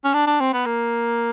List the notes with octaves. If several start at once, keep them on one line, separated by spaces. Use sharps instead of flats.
C#4
D4
D4
C4
B3
A#3